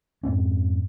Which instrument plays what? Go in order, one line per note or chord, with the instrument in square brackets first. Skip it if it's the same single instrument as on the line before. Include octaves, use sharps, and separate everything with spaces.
[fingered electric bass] F2 G#2 C4 C#4